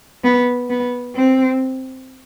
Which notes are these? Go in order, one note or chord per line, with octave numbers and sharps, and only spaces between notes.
B3
B3
C4